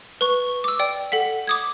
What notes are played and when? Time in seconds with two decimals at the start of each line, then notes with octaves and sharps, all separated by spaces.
0.21 B4 C#6
0.64 D6 E6
0.79 D5 G5
1.12 A4 F#5 B6
1.47 D6 D#6 G#6